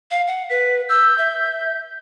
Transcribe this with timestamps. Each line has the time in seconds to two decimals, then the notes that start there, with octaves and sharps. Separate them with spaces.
0.11 F5
0.27 F#5
0.50 B4 B6
0.89 E6 G6
1.18 E5